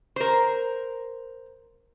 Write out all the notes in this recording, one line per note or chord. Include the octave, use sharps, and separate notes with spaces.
A#4 C5